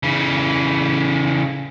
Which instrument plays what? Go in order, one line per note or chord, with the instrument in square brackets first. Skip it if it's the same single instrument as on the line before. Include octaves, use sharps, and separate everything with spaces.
[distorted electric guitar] C#3 E3